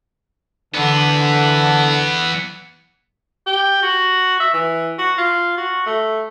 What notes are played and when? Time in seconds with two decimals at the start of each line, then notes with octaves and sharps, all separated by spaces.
0.75 D3 E3 B3
3.47 G4
3.83 F#4
4.40 E5
4.53 E3
4.99 F#4
5.18 F4
5.58 F#4
5.86 A3